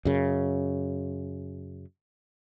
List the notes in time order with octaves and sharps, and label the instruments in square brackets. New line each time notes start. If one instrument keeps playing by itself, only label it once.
[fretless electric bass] F#2 C#3